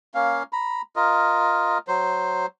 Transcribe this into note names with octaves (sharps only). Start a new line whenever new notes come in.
A#3 C#4 F5
A#5 B5
F4 A#4 D#5
F#3 C5